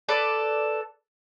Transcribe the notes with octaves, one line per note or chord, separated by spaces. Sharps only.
A4 B4 D5